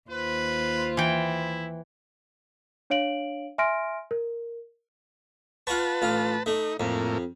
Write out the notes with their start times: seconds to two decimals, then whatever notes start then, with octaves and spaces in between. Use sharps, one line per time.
0.11 D#2 F4 B4 C5
0.97 E3 E4 G5
2.90 D4 C#5 F5 D7 F#7
3.58 E5 G#5 C6 F6 A#6 D7
4.11 A#4
5.67 F4 B4 F#5 A5 C#6
6.02 A1 F4
6.46 A3 D#4
6.80 F2 A2 A#3